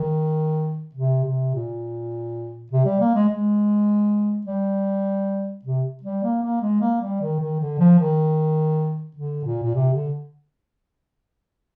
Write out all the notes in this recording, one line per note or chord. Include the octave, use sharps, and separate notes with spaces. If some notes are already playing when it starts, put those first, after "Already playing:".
Already playing: D#3
C3
C3
A#2
C3
G3
A#3
G#3
G#3
G3
C3
G3
A#3
A#3
G#3
A#3
G3
D#3
D#3
D3
F3
D#3
D3
A#2
A#2
C3
D3